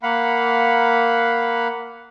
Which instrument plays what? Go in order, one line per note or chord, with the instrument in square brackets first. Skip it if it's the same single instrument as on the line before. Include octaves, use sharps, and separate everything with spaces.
[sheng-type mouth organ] A#3 F5 F#5 B5